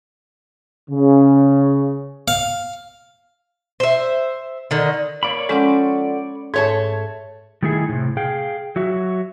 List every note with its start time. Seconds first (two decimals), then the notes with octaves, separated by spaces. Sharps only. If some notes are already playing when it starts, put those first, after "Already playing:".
0.90 C#3
2.28 F5
3.80 C5 E5
4.71 D3 D#3
5.23 A#3 C#5 D5 B5
5.49 F3 G#3 C#4 A4 F#5 C6
6.54 G#2 A3 C#5 A5 G#6
7.63 D#3 G3 A3 D#4 E4 G#4
7.89 A2 C3
8.17 G#4 F5 G5
8.76 F#3 F#4 E5